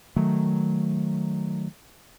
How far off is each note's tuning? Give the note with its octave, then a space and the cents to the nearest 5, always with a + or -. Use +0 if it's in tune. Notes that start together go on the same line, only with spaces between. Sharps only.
D#3 +0 F#3 +5 A3 +0